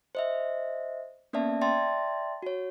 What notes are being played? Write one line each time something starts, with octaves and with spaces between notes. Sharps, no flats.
C5 D#5 E5
A#3 B3 C#4 D5 E5 A5
D5 E5 G5 A5 C6 A6
F#4 C#5